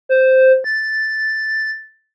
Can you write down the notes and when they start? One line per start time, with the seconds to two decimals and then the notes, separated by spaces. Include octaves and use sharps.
0.09 C5
0.64 A6